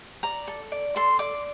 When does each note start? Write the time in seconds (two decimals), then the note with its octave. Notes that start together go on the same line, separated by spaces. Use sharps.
0.23 D5 A#5
0.48 A4
0.72 D5
0.96 A4 C6
1.19 D5 D6